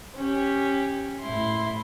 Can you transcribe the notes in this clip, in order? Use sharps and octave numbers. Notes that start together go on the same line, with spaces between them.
C#4 G4
A2 E4 C6